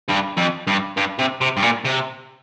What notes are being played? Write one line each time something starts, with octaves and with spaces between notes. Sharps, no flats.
G2
F2
G2
G2
C3
C3
G2
A#2
C3